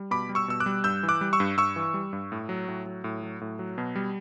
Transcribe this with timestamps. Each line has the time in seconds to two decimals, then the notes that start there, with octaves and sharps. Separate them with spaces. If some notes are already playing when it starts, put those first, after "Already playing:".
Already playing: G3
0.11 B2 B5 D6
0.29 G3
0.35 C#6 E6
0.48 B2 E6
0.60 D6 F#6
0.66 G3
0.84 G2 E6 G6
1.03 E3
1.09 D6 F#6
1.21 G3
1.33 C#6 E6
1.40 G2
1.57 G2 C#6 E6
1.76 E3
1.94 G3
2.13 G2
2.32 A2
2.49 F#3
2.68 A2
2.86 F#3
3.04 A2
3.23 F#3
3.41 A2
3.59 F#3
3.78 B2
3.96 G3